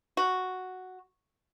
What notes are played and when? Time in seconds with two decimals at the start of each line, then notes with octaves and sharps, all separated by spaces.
0.17 F#4